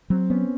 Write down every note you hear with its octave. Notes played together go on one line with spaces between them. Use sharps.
F#3 C4
B3 C#4